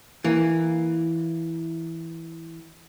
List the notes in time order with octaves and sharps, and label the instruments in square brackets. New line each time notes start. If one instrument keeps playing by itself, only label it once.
[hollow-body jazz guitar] E3 A#3